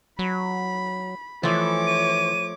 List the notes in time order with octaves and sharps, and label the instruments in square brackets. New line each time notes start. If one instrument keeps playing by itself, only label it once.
[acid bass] F#3 [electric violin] B5
[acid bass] E3 [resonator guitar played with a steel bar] F3 A3 [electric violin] C#5 D6
[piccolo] D#7